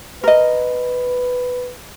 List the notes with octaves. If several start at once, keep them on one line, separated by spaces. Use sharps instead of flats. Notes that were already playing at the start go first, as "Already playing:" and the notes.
A#4 B4 D#5